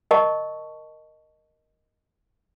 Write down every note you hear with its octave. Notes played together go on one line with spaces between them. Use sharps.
A#4 D#5 A5 C#6